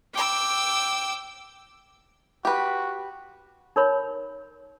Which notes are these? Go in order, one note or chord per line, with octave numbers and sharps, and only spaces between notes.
G5 D6 E6
F#4 G4 B4
D#4 A#4 C#5 B5